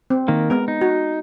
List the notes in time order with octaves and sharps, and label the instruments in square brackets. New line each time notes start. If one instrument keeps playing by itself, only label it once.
[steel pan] C4
[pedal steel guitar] D#3 A#3
[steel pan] G#3 B3 [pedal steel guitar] A#4
[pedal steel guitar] D#4
[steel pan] F#4